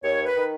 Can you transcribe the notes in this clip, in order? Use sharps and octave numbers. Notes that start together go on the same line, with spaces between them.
D#2 C#5
B4
D#3